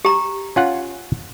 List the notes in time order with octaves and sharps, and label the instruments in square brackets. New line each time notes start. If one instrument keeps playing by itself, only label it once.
[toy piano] G4 A#5
[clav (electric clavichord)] C#4 F4 F#5